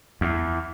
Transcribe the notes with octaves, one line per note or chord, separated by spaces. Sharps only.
E2